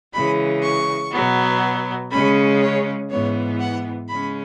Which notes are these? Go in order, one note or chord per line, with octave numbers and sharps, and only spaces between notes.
C#3 E3 G#3 B5
C#6
B2 F#3 B3
C#3 G#3 C#4 B5
C#5
G#2 E3 B3 C#5
F#5
C#3 G#3 C#4 B5